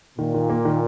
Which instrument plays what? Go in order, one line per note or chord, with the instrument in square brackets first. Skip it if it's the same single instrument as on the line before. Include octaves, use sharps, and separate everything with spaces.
[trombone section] A#2 [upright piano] D#3
[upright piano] D#3
A#3
D#3